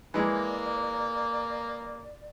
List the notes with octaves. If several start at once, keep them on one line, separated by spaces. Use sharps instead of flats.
E3 G#3 A#3 D5